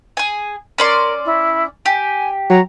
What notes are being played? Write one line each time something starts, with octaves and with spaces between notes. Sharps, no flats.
G#4 G#5
C#4 A#4 D5 C6
E4
G4 G#5
F#3 A#5